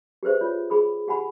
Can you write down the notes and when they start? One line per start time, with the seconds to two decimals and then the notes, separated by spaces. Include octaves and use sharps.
0.23 G4 G#4 B4 C5 E5
0.41 F4 C#5
0.70 G#4 B5 D#6
1.08 G4 F#5 G#5 B5